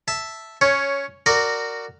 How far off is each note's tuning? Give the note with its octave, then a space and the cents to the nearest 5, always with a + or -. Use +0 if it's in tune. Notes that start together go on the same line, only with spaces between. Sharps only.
E5 +0 A5 +0
C#4 +10 C#5 +0
F#4 +5 A#4 -15 D5 +0